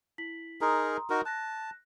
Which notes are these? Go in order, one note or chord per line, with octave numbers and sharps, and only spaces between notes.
E4 B6 F#7
D#4 G#4 A#4 A#5 C6 D#6
D#4 F#4 A#4
A5 F#6 A#6